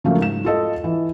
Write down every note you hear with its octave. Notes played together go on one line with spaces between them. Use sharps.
C#3 F3 F#3 A3 A#3 C#4
G#2 E7
F4 A4 D#5
E3